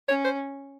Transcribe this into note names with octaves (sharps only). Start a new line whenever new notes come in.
C#4 C#5
C5